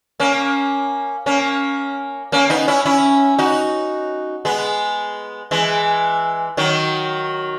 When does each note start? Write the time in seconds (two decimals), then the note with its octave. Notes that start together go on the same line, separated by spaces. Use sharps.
0.20 A#3 C#4
1.26 A#3 C#4
2.32 A#3 C#4
2.50 B3 D#4
2.68 C#4 E4
2.85 C#4 E4
3.39 D#4 F#4
4.45 G#3 B3
5.51 E3 G#3
6.57 D#3 F#3